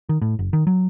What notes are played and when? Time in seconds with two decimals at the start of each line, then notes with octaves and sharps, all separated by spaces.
0.09 D#3
0.22 A2
0.39 F#1
0.53 D#3
0.67 F#3